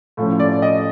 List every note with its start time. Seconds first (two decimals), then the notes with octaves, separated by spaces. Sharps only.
0.17 A2 F3 A3 C#4
0.40 D5
0.62 D#5